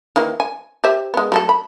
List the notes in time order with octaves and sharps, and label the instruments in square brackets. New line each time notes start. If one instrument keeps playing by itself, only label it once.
[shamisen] D#3 E3 A#3
G#5
G4 C5 E5
G#3 B3
F#3 A3 A4
B5